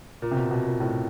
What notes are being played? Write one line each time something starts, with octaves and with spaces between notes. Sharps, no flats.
A#2
C3
B2
B2
A#2
A2